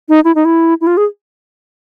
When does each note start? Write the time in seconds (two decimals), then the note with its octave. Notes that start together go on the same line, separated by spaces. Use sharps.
0.09 D#4
0.25 E4
0.35 D#4
0.45 E4
0.81 E4
0.87 F4
0.97 G#4